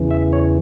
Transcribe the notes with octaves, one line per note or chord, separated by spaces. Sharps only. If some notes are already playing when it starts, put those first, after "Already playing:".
Already playing: E2 C#3 E3
E5
C#5